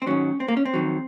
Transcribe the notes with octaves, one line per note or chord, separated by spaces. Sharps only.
C4
G#2 D#3 F#3 C#4
C4
A#3
C#4
C4
F2 D#3 F#3